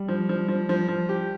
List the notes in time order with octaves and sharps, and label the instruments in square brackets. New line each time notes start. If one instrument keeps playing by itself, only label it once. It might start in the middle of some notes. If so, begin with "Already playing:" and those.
Already playing: [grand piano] G3
[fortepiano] F3
F3
F3
F3
F3
G4